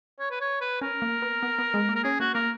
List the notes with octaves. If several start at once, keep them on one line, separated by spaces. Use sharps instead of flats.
C#5
B4
C#5
B4
C#4 A#4
A#3
B3
B3
B3
G#3
A#3
A#4
C#4 G#4
A#3 F#4
A#3 A#4